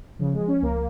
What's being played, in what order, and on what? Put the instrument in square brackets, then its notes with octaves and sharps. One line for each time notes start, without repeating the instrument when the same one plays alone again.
[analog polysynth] C#3 [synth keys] F3
[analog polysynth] G#3
[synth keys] F3
[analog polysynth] C#4
[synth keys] C#2 [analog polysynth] A#3